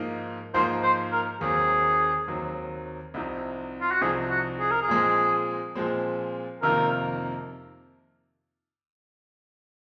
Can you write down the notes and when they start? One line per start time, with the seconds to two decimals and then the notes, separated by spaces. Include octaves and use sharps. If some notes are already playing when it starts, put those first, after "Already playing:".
Already playing: G#2 F3 A#3 D#4
0.54 G#2 F3 A#3 D#4 C5
0.83 C5
1.12 A#4
1.41 D#2 D#3 F#3 C4 G#4
2.27 D#2 D#3 F#3 C4
3.14 C2 C3 F3 C4 D#4
3.81 F4
3.91 F#4
4.01 C2 C3 F3 C4 D#4 G#4
4.30 F#4
4.59 G#4
4.71 A#4
4.82 G#4
4.88 A#2 F3 G#3 C4
5.75 A#2 F3 G#3 C4
6.62 F2 C3 D#3 A#3 F4 A#4